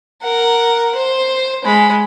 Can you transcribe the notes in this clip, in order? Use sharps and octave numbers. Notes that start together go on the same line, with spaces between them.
A#4 F#5
C5
G#3 B5